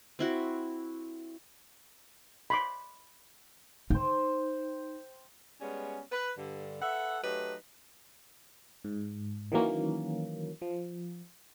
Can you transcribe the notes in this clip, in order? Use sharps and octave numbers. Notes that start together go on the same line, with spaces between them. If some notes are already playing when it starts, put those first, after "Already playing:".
C4 E4 F#4
B5 C6 D6
D#4 C5 G5
G3 G#3 B3 C#4
B4
G2 D3
A4 B4 E5 F#5
F#3 A3 D#4 G4 B4
G#2
D#3 E3 F#3 A#3 C#4
F3